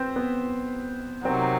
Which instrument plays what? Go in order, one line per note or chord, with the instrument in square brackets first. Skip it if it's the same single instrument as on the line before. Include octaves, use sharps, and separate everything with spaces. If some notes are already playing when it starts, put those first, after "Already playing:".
Already playing: [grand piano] C4 B4 C5
B3
[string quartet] C3 D#3 F#3 [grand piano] C4